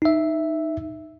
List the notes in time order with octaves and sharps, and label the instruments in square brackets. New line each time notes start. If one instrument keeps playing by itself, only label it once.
[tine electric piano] D#4 E5